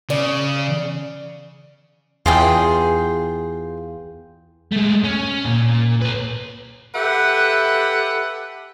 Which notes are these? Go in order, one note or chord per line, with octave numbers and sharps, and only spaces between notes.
C#3 D5
E2 F4 G#4 G5
G#3 A3
C#4
A#2
B4 C#5
G4 A4 B4 E5 F#5